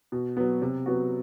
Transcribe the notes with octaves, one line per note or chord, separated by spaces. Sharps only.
B2
F#3 B3
C3
F#3 B3 F#4